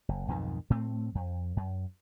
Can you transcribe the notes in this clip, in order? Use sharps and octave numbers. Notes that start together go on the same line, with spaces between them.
F#1
B1 F2 G#2 D#3
A2 A3 C4
F2
F#2